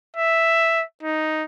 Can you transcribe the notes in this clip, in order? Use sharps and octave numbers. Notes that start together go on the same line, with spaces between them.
E5
D#4